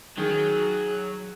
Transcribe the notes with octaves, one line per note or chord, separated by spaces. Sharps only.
D#3 F#3 G#4